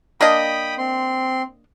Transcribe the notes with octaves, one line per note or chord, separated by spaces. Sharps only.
A#3 D4 D#5 G5 B5 D#6
C4 C6